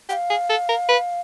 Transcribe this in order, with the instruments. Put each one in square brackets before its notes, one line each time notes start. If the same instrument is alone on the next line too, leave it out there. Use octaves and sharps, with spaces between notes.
[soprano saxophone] G4 [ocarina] F#5
[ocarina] F5
[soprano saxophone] G#4
A4
A#4
B4